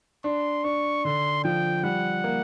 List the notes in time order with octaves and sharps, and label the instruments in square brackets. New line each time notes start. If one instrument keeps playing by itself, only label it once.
[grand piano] D4 [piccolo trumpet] C6
[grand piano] D4 [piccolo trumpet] C#6
[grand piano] D3 [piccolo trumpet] C6
[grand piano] F3 [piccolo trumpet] G5
[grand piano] G3 [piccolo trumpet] F#5
[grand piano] A#3